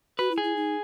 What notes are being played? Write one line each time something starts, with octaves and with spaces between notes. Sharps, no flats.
F#4 B4
E4
G#4
E4
D#4